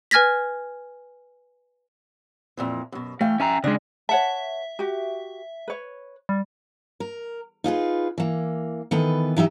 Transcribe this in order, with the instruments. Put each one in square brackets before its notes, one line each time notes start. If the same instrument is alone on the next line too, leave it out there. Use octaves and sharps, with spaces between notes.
[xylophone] B4 G#5 F6 G#6 A#6 B6
[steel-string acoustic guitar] F2 A#2 E3
F#2 B2
[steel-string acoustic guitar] E3 F5 G5 [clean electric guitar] A3
[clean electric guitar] C#4 G#5 A#5 [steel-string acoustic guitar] E5
[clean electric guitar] C#3 G#3 [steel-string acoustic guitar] D4
[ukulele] C#5 F#5 A5 [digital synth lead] E5
[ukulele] F#4 G4
B4 C#5
[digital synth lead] G3
[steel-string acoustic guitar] A#4
D#4 F4 G#4 B4
E3 A#3
D#3 E3 B3 A4 B4
E3 D#4 G4 E5